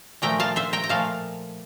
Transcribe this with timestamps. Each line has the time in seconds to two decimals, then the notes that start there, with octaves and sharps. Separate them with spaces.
0.22 A#2 F3 A3 G5 A#5
0.40 F5 A5
0.56 C5 E5
0.73 G5 A#5
0.84 A#5
0.89 A#2 F3 A3 F5 A5